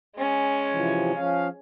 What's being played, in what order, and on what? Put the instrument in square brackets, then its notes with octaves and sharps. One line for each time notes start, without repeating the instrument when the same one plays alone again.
[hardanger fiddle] G#3 C#4
[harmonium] C3 E3 F3
F3 C#4 F5